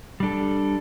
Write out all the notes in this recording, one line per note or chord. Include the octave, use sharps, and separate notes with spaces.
G3 D4 A4